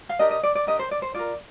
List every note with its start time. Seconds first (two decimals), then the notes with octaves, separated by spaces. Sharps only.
0.09 F5
0.19 D4 G4 A#4 D#5
0.31 D#5
0.43 D5
0.55 D5
0.67 D4 G4 A#4 D#5
0.79 C5
0.91 D5
1.02 C5
1.14 F4 A#4 D5